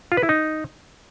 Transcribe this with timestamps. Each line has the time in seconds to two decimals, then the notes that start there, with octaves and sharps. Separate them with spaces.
0.12 F4
0.17 B4
0.23 E4
0.29 D#4